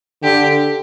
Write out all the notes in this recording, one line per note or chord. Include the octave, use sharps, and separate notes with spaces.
D3 G4